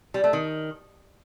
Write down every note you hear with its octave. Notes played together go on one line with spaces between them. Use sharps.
G3
A3
D#3